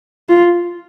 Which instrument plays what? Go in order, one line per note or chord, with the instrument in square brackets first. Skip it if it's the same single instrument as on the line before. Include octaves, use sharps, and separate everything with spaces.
[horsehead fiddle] F4